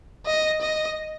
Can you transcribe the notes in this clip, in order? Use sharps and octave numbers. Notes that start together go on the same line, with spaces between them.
D#5
D#5